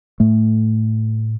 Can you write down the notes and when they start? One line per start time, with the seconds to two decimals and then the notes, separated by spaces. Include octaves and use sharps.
0.20 A2 A3